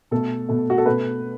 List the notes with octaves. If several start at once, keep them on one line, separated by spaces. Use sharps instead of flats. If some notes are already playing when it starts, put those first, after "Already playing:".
B2 A3 A4
B2 A3
F#4
A4
B2 A3 B4